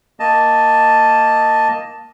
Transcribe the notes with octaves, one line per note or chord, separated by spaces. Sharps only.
A#3 D#5 A5